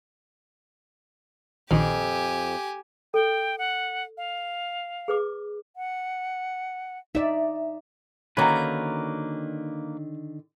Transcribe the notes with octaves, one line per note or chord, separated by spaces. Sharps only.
A#1 F2 D#3 G4 C5 G#5
A4 G5
F#5
F5
G#4 B4 D6
F#5
D#4 D5 E5
D3 D#3 A#3 C#4 F#4 B4 A#5